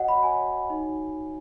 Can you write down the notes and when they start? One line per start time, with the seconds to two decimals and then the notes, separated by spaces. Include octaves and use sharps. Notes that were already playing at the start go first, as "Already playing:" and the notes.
Already playing: F#4 C#5 D#5 F#5
0.08 B5
0.23 F#4 C#5 G#5
0.70 D#4 F#4 C#5